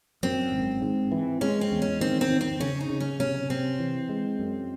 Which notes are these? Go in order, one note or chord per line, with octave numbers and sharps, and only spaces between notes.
F#2 C4
G#1
G#2
E3
G#3 C#4
C4
E2
C#4
D#3 C4
C4
D#3
C4
C#3 C#4
D#4
C#3
C#4
C3 C#4
C3 C4
E3
G#3
F#2